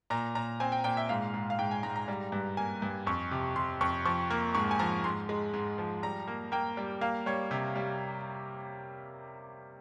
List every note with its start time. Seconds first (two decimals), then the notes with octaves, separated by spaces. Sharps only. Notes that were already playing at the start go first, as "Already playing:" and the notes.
0.10 A#2 A#5
0.35 A#2 A#5
0.60 C4 G#5
0.72 G5
0.84 A#2 G5
0.97 E5
1.09 G#2 F5
1.34 G#2
1.50 F5
1.59 G#2 G5
1.71 G#5
1.83 G#2 A#5
1.96 A#5
2.08 G3
2.32 G2
2.57 A#3 G#5
2.82 G2
3.07 F2 C#6
3.31 C3
3.56 C3 C6
3.81 F2 C#6
4.05 F3 C#6
4.30 A#3
4.55 G#2 C#6
4.71 G#5
4.79 F3 A#5
5.04 G#2 C6
5.29 G#3
5.54 G#2
5.78 F3
6.03 G3 A#5
6.28 A#3
6.52 A#3 G5
6.77 G3
7.01 A#3 F5
7.26 G3 C#5
7.51 C3
7.76 G3